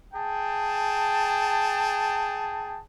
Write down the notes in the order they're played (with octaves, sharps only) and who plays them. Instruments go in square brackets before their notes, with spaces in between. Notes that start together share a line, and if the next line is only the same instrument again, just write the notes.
[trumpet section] G#4 G5 A5